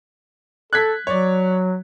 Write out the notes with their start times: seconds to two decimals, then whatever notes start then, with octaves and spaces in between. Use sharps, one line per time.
0.73 A4 F#6 G#6 B6
1.07 F#3 C#5 D5